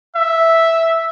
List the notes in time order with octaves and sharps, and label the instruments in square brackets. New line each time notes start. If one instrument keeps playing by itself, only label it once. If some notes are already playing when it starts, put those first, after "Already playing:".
[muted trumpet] E5